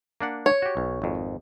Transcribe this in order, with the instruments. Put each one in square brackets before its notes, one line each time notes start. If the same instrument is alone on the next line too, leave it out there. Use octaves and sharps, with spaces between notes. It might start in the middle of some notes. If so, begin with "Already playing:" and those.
[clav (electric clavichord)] A#3 D4 F#5
[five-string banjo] C#5
[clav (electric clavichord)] F#4 G4
B1
G#1 F2